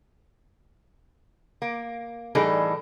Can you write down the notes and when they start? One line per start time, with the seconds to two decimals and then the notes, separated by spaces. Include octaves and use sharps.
1.62 A#3
2.35 A2 E3 G3 D#4 G#4 A4